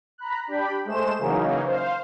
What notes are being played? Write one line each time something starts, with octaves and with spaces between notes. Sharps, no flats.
A#5 B5 F#6
D4 G4 G5 B5
G#3 A3 C5 E7
C#3 E3 F#3 A#3 C#4 D#4
C5 F5